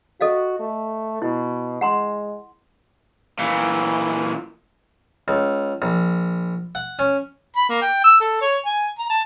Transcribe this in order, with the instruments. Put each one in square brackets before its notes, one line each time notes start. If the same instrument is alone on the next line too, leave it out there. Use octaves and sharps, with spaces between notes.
[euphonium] F#4 [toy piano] A4 D#5 F5
[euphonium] A3
[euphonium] B2 [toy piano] E4
[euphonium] G#3 [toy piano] F#5 A#5 C6
[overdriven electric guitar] A#2 E3
[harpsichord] C#2
A#1
F#5
C#4
[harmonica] B5
A#3
G5
E6
A4
C#5
G#5
A#5
A5